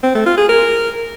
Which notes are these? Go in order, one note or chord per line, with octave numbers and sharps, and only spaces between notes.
C4
A3
F4
G#4
A#4